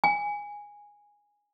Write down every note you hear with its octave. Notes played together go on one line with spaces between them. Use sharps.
G#5